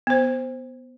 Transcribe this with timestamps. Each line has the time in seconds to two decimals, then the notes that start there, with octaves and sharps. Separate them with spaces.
0.07 B3 C5